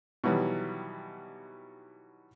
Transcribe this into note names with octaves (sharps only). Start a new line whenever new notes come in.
B2 D#3 E3 F#3 G3